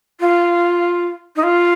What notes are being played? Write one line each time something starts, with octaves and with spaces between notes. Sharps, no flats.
F4
D#4
F4